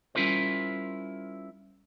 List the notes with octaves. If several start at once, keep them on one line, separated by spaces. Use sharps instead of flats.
G3 C#4 E4 F4 A#4 C5